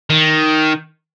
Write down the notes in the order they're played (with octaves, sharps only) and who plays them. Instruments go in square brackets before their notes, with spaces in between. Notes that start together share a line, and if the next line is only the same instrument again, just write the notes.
[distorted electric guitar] D#3